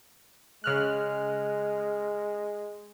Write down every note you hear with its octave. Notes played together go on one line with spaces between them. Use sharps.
C#3 G#3 F6 F#6